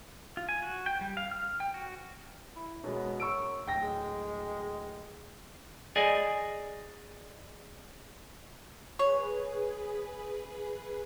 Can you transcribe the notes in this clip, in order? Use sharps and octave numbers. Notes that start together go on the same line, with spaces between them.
F4
G#5
F#4
G5
G3
F5
F6
G5
F#4
E4
F#2 B2 G#3 B3
F#2 C#6 E6 D7
D1 G5 A#6
G#3
G#4 D5 D#5 G#5
G#4 B4 C#5